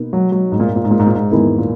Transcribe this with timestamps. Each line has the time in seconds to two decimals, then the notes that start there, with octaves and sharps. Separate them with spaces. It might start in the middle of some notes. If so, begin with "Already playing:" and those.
Already playing: B2 A#3 D#4
0.13 F#3
0.32 F#3
0.52 G#2
0.60 A#2
0.68 G#2
0.76 A#2
0.84 G#2
0.91 A#2
0.99 G#2
1.07 A#2
1.15 G#2
1.31 E2 G#2 D#3 A#3 E4
1.58 A#2